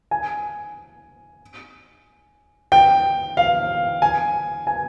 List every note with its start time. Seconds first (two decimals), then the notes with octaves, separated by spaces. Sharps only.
0.11 G#5
2.72 G5
3.37 F5
4.02 G#5
4.67 G#5